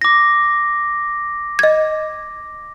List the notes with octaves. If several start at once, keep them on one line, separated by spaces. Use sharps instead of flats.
D6 A#6
D#5 G#6